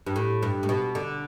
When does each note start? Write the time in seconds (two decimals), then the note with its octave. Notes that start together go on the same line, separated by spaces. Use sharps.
0.07 G2
0.16 A2
0.43 G2
0.63 A2
0.69 B2
0.95 D3